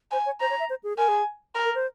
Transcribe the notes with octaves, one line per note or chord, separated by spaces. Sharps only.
C5 G#5
C#5
C5 A#5
C#5
E5
C5
G#4
A#4 G#5
G#4
A#4
A#4
C5